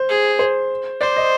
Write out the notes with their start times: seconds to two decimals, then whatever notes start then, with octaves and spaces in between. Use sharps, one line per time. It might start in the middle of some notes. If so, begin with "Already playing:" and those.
Already playing: C5
0.09 G#4
0.39 C5
1.01 C5 D5
1.17 D#5